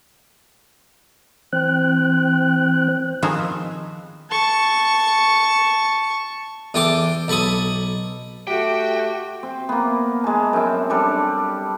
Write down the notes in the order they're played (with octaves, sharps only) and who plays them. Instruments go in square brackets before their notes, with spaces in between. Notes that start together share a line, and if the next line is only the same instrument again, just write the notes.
[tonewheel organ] E3 C4 C5 G5 F#6
[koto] D#3 F3 B3 C4 G#4 C5
[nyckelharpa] A5 C#6
[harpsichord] E2 E3 A4 G5 C6 D6
B1 A4 B5 C#6 D#6
[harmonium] A3 [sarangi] F#4 [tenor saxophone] G4 [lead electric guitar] G5
[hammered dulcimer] C4
A#3 B3
G#3 A5
F#2 C4
G3 D4 A4